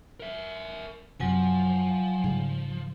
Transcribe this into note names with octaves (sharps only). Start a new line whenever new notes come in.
A#4 E5
F#2 C3 F3 F#3 G#5
G#2 C#3 G3